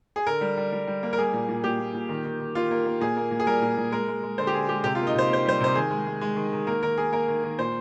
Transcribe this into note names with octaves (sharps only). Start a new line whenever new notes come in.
G#4
D3 A#4
G3
G3
G3
G3
A#3
A#4
G3 G#4
A#2
A#2
A#2 G4
A#2
A#2
D#3
D#3
D#3
A#3 F4
A#3
A#3
A#2 G#4
A#3
A#2
G#4
G3 A#4
A#2
A#2
G#3 A#4
G#3
G#3
D3 C5
G4
D3 G#4
G#3 G4
C3 G4
F4
A#3
D#4
C3 C5
A#3 C5
G3 C5
C3 C5
D#3 G#4
G#3
G#3
G#3
D#3
D#3
A#3 A#4
D#3 A#4
A#3 G#4
A#3 A#4
D#3
D#3
A#2 C5